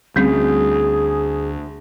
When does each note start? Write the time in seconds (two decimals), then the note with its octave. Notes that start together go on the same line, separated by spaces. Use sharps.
0.16 D2 G3 C4 C#4 G#4